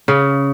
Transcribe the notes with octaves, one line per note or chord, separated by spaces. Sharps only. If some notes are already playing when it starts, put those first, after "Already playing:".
C#3